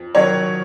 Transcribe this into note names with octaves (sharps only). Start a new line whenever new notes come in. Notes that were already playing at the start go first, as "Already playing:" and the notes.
Already playing: F2
D#3 F#3 C#5